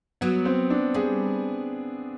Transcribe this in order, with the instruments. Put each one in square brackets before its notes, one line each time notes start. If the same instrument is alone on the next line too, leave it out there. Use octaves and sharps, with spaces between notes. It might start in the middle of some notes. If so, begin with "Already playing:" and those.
[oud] F#3 [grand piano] B3
[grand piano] C4
D4
[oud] G3 [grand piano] G#4